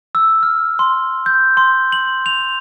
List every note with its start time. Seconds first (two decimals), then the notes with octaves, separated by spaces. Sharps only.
0.15 E6
0.43 F6
0.79 C6
1.26 G6
1.57 C6
1.92 F#7
2.26 F7